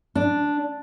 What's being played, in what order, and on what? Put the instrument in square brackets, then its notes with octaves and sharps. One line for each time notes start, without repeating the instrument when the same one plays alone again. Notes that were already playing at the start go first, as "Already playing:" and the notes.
[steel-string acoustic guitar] D4